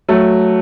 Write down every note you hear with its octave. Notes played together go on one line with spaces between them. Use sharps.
F#3 A3